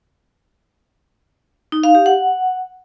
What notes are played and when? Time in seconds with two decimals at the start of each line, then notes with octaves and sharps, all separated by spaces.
1.72 D#4
1.84 F5
1.95 G4
2.06 F#5